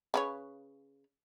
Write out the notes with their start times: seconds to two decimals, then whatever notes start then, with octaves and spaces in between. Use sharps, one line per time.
0.14 C#3 B4 C#5